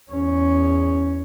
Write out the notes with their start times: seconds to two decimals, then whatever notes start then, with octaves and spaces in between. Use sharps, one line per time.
0.12 E2 C#4